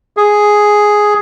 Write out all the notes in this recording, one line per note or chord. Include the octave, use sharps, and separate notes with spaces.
G#4